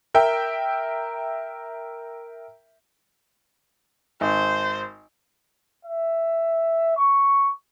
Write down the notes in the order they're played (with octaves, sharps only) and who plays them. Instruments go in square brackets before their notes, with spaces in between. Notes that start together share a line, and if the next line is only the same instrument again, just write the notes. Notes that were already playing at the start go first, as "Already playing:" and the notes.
[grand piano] A#4 E5 G5
[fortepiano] G#1 [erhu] C5
[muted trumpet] E5
C#6